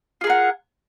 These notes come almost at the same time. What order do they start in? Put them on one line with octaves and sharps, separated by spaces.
F4 G#4 A#4 F#5